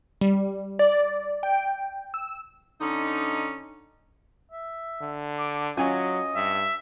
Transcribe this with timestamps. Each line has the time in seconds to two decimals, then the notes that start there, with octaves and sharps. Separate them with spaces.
0.21 G3
0.79 D5
1.43 G5
2.14 E6
2.81 D3 C#4 D#4
4.51 E5
5.01 D3
5.38 D6
5.77 F#3 C#4 F4 D#5 G#5
6.35 G2 E5